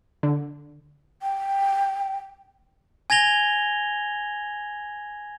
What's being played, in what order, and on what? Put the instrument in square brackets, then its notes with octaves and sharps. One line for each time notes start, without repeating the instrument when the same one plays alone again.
[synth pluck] D3
[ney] G5
[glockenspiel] G#5 G#6 A#6 F7 G7